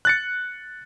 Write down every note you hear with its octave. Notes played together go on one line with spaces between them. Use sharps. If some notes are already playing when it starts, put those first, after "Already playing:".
F#6 A6 C#7